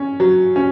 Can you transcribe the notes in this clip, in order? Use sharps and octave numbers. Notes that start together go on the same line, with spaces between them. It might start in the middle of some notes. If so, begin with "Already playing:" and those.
Already playing: C#4
F#3
C#4